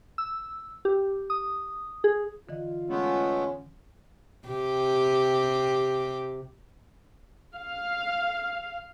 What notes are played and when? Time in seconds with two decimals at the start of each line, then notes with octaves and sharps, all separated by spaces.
0.18 E6
0.85 G4
1.30 D#6
2.04 G#4
2.49 D3 E3 F4 D#5
2.90 G#3 A3 B3 C#4
4.48 C3 G4
7.55 F5